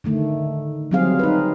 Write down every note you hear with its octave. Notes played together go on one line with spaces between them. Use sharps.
D3 D#3 A3
F#3 G3 C4 G#4 F5
D#4 B4